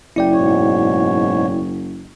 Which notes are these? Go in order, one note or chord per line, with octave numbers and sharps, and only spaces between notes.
F#1 E4 D5 G5
G#2 B2 C#5